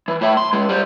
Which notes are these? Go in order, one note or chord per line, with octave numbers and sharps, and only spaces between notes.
E3
A2 E5
C6
C#2 G#3
G3 C5